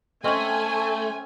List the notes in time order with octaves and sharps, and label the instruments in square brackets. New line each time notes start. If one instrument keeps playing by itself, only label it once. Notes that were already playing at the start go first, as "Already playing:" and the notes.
[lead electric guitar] A3 [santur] C4 C#4 [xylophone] D#5 F#7 [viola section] G#5